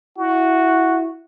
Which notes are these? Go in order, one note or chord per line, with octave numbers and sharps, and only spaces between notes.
E4 F#4